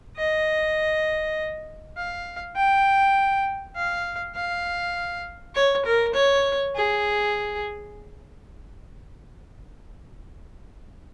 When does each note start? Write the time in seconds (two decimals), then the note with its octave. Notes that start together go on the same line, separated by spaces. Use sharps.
0.17 D#5
1.96 F5
2.56 G5
3.76 F5
4.35 F5
5.54 C#5
5.85 A#4
6.14 C#5
6.75 G#4